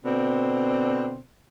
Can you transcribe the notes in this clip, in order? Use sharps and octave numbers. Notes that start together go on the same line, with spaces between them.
B2 D3 C4